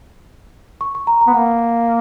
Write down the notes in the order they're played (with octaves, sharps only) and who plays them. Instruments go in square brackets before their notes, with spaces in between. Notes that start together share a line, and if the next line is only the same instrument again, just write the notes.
[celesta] C#6
C#6
A#5
A#5
[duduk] B3
[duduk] A#3 [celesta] F#5